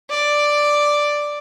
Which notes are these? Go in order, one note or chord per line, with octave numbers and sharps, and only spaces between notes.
D5